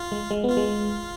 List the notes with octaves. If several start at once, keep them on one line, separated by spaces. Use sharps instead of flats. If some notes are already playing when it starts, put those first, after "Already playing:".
Already playing: F4
G#3
G#3
B3
F4
G#3